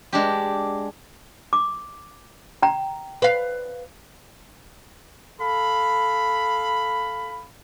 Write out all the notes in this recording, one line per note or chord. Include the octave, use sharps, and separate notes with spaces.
G#3 D4 G4
D6
G5 A#5
B4 F5
A4 F5 B5